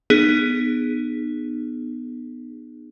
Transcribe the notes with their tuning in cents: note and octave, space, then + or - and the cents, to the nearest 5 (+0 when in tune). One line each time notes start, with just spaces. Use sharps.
B3 +0 D#4 -35 G#4 +0